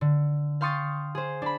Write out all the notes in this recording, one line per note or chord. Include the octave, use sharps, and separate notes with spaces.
D3
F5 G5 C6 C#6 D#6 A6
G#4 C5
D4 B5